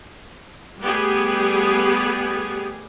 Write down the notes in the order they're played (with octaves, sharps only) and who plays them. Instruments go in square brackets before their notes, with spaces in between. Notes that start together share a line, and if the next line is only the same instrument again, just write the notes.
[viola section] G3 A3 B3 G4 G#4